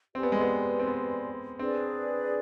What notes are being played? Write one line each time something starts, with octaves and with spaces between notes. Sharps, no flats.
C4 G4 B4 D5 G#5
B3
G#3
B3
C4
B3
C4 D4 G#4 B4 D5